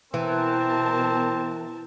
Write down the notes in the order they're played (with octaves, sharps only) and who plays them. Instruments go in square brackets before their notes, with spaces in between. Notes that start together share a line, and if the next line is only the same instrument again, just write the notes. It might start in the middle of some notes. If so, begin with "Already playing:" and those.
[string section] B2 A#4 A5 [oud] E3 [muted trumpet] C4